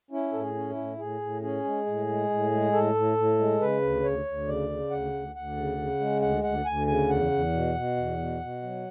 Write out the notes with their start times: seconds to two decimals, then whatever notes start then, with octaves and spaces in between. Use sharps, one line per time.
0.11 C#4 E4
0.32 A2 A4
0.40 G#4
0.55 C#4
0.70 E4
0.77 A2
0.98 A2 G#4
1.21 A2
1.42 C#4 G#4
1.64 G#3
1.86 A2
2.08 G#3
2.30 A2
2.51 G#3
2.72 A2 A4
2.95 A2
3.17 A2
3.39 G#3
3.61 C#3 B4
3.82 D2
4.04 D2 C#5
4.25 D2
4.48 C#3 D5
4.70 C#3
4.91 D2 F#5
5.13 D2
5.35 D2 F#5
5.57 C#3
5.78 C#3
6.00 G#3
6.21 D2 F#5
6.43 D2 F#5
6.66 D2 G#5
6.87 C#3 G#5
7.09 E2 F#5
7.31 E2
7.53 B2
7.75 B2
7.97 E2
8.18 B2
8.41 B2
8.62 F#3